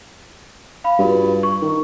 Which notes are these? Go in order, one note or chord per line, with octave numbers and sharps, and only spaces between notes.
F5 B5
G2 F4 F#4
C#6
D#3